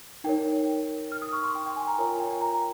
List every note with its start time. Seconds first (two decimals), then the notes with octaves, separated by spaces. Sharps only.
0.24 D#4 A#4 C#5 G5
1.12 F6
1.22 D#6
1.33 C#6
1.43 C6
1.55 G5
1.66 G5
1.76 G#5
1.87 A#5
1.98 F4 A#4 C#5
2.20 G5
2.31 G5
2.41 A#5